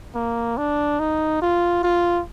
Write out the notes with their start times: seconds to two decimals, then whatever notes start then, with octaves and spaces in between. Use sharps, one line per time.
0.15 A#3
0.57 D4
0.99 D#4
1.42 F4
1.83 F4